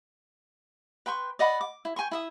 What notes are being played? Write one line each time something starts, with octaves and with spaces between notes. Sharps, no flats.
B4 G5 C6 C#6
D5 D#5 F#5 B5
D6
E4
G5 G#5 C6 C#6
E4 E5 D#6